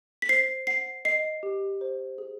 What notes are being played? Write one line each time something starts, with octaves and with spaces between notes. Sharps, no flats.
B6
C5 C7
F#5 C7
D#5 C7
G4
C5
G#4